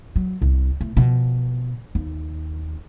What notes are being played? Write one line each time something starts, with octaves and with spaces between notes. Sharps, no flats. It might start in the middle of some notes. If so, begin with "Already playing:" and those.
F#3
C2
A2
B2 F3
D#2